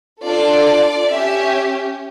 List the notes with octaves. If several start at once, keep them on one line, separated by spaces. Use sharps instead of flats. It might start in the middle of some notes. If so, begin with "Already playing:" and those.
D4 F4 A4 D5
C#4 G4 E5